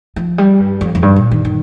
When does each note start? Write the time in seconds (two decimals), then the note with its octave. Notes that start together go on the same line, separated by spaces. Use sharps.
0.16 F3
0.38 G3
0.59 G2
0.81 F2
0.95 F2
1.02 G2
1.16 A#2
1.31 D#3
1.45 D#3